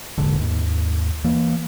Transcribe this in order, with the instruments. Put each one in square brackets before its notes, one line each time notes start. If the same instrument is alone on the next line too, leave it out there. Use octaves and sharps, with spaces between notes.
[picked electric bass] E1 A#1 G#2 D3
D#2 G#2
E3 A#3